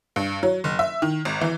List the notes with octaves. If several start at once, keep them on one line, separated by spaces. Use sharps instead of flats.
G2
F#3
F#1
E5
D#3
G#1
E3